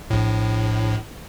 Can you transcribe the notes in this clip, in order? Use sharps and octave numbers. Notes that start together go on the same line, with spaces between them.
A#1 A2